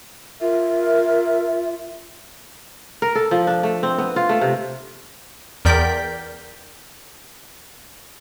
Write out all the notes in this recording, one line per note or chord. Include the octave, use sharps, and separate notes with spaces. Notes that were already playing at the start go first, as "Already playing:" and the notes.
F4 A#4 E5
A#4
A4
F3
D4
A3
C4
B3
F4
A3
C3
E2 A#4 D5 G5 G6 B6